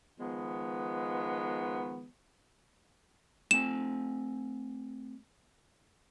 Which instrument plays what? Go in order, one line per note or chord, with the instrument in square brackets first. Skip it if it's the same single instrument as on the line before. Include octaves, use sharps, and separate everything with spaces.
[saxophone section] D#3 F3 G#3 B3
[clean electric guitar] A3 C4 G#5 [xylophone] E7